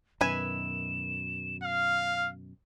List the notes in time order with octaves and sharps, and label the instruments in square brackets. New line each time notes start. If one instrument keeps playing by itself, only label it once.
[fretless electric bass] F#2 B2 D#3 [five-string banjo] B4 E5 G#5 [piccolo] E7
[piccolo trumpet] F5 [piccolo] F6